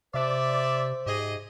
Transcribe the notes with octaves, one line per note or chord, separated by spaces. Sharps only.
C3 C5 D5 E5
G#2 G4 G#4 D#5